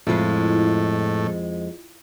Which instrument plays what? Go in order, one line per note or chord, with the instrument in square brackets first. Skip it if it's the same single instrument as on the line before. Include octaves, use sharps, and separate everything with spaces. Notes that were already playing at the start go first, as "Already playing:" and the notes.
[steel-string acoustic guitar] F2 G#3 [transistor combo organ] A2 [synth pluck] E4 F4